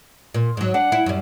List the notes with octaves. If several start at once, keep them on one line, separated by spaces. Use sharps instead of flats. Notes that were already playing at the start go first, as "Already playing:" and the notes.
A#2
G#2 F#3
D4 F#5
E4
F#2 G3